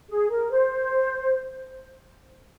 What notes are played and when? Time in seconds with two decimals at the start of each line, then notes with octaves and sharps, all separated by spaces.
0.09 G#4
0.29 A#4
0.51 C5